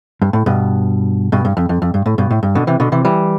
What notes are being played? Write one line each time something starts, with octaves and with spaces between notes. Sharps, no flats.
G2
A2
G2 B2
G2 B2
G2
F2
F2
F2
G2
A2
G2 B2
A2
G2
B2 D3
C3 E3
B2 D3
C3 E3
E3 G3